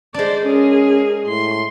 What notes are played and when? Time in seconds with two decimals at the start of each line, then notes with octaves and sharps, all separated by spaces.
0.14 G#3 D4 C5 D5
0.45 C#4 G#4 A#4
1.26 A2 C6